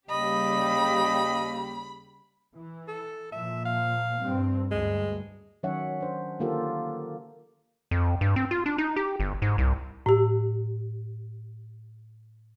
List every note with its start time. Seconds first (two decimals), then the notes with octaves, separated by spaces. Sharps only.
0.10 D#2 C#3 G3 G4 D#5 B5
2.56 E3
2.88 A4
3.32 A#2 F3 E5
3.65 F5
4.20 G2 C4
4.71 D2 G2 G#3
5.63 D#3 F#3 C#4 C#5 E5 F#5
6.01 D4 C5
6.39 D3 D#3 A#3 F4 G4 A4
7.91 F2
8.21 G2
8.36 C4
8.51 F4
8.66 D4
8.78 D#4
8.96 G4
9.20 G1
9.42 G#2
9.58 C2
10.06 A2 G4